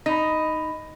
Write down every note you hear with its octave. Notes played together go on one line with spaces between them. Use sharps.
D#4 B5 A#6